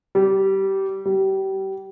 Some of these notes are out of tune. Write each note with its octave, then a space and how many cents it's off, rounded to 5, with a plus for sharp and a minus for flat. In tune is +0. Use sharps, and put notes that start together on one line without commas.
G3 -20
G3 -30